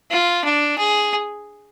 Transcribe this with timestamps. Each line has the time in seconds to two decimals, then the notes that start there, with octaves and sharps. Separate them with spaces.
0.11 F4
0.44 D4
0.78 G#4